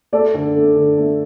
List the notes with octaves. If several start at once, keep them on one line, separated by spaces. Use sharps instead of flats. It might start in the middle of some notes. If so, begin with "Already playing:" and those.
A3 A4 D5
D3
A3
D3
A3